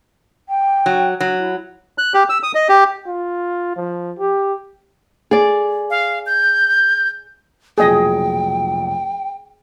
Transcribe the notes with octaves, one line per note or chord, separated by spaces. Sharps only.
G5
F#3
F#3
E4
F#6
G4
E6
D#6
D#5
G4
F4
F3
G4
G#4 D5
F5
G6
F1 B1 A#2 G#4 D#5 G5